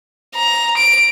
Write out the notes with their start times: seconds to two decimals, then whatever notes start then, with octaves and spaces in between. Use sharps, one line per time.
0.36 A#5
0.77 D7